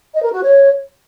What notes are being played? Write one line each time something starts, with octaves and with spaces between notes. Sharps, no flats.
D#5
A#4
F#4
C#5